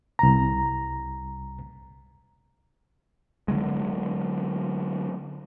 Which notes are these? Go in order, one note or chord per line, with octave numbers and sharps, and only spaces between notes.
C2 A#5
D3 E3 F#3 G#3